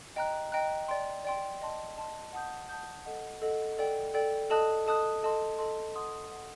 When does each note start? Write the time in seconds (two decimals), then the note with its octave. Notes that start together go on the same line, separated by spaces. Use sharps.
0.16 D#5 G5 A#5 F#6
0.52 D#5 G5 A#5 F#6
0.88 D5 G5 C6
1.25 D5 G5 C6
1.61 D#5 A5 C6
1.97 D#5 A5 C6
2.33 F#5 A5 D#6 G6
2.69 F#5 A5 D#6 G6
3.05 A4 D#5 F#5
3.42 A4 D#5 F#5
3.78 A4 D5 G5
4.14 A4 D5 G5
4.50 A4 D#5 A5 D#6 F#6
4.86 A4 D#5 A5 D#6 F#6
5.23 A4 D#5 A5 C6
5.58 A4 D#5 A5 C6
5.95 F#5 C6 D#6
6.31 F#5 C6 D#6